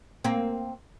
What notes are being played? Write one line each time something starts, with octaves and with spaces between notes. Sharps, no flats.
A#3 C4